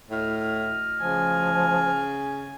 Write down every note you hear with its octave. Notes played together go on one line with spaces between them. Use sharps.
D2 A2 D#5 F6
C#3 F3 G#5